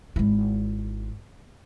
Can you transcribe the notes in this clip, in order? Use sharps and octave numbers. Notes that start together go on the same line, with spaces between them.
G#1 E4